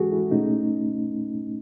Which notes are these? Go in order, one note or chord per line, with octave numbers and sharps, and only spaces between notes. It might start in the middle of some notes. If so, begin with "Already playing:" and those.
Already playing: E3 G#3 C#4 F#4 G#4 A4
E4
B2 A3 C#4 D#4